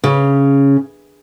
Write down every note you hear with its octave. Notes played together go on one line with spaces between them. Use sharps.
C#3